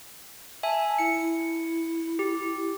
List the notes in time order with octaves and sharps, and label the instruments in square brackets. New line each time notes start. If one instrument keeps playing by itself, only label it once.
[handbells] E5 G#5 [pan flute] A5
[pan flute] E4 [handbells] C#7
[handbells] G4